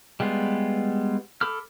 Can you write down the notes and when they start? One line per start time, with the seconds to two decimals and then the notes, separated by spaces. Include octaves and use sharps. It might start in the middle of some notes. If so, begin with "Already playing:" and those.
0.20 G3 G#3 B3 F4
1.41 A4 B5 D6 F6